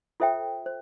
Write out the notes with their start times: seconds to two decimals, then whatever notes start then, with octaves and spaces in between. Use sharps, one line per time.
0.20 F4 A4 C5 E5 G5
0.66 C5